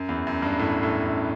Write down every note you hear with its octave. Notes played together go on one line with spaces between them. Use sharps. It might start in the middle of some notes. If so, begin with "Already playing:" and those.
Already playing: F#2
E2
F#2
G2
A2
A2
F#2